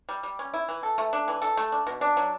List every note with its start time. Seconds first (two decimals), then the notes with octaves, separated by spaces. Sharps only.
0.09 G3
0.23 G3
0.39 C#4
0.54 E4
0.69 E3
0.83 A4
0.98 A3
1.13 D4
1.28 E3
1.42 A4
1.57 A3
1.72 D4
1.87 B2
2.01 D4
2.17 F#3